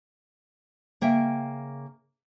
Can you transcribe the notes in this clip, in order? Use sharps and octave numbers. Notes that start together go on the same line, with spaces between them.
C#3 A#3 E5 G5